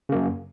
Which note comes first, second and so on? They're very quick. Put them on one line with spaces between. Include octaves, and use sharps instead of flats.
C#3 A#3 F#2